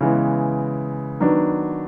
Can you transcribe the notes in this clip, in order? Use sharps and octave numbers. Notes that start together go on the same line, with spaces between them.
C#3 E3 G#3 B3
D#3 F#3 B3 D4